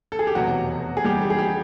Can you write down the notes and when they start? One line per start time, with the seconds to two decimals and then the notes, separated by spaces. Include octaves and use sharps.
0.12 A4
0.19 G#4
0.27 G4
0.35 F1 E2 B2 F#3 F#4
0.97 G#4
1.04 G3 G4
1.22 G4
1.30 G#4
1.39 G4